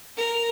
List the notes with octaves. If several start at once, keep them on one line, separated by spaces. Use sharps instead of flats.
A#4